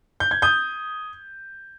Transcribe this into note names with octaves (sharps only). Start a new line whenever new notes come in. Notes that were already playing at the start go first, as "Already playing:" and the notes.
G6
G#6
D#6 G6